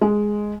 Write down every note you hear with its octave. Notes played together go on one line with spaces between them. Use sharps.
G#3